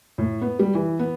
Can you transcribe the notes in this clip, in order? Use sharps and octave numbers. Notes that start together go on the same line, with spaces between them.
A2
B3
G3
E3
B3